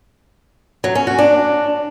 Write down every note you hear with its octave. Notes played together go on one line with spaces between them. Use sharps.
F#3
C#4
F#4
D4